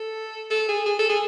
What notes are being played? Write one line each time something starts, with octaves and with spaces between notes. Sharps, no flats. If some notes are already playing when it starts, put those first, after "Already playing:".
Already playing: A4
A4
G#4
G#4
A4
G#4